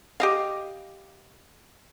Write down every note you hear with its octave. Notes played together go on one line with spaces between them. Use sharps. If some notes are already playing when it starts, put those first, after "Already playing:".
G4 D#5 F5